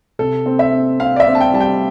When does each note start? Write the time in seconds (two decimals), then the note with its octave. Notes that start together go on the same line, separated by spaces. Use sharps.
0.19 C3 A4
0.46 C4
0.59 E5
0.73 C4
1.00 C4 F5
1.16 D5
1.20 E5
1.26 C4
1.35 A5
1.40 G5
1.53 G3 A5
1.61 G5